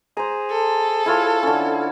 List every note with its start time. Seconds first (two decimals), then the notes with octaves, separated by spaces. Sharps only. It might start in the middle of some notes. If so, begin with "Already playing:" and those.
0.17 G#4 C5 A#5
0.51 A4
1.06 E4 F4 C#5
1.43 D3 C#4